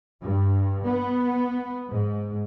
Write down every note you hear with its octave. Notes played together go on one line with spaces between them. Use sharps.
G2
B3
G#2